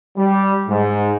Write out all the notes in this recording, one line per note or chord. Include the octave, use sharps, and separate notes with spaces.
G3
G#2